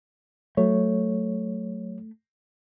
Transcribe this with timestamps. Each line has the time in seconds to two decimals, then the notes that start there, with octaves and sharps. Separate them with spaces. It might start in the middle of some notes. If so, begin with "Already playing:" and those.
0.57 F#3 A3 C#5